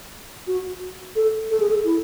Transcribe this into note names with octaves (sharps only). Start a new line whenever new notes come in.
F#4
A4
A4
G#4
A4
E4